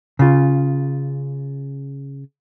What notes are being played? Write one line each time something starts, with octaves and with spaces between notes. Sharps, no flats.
C#3 F4